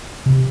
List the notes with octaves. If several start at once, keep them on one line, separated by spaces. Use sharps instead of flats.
C3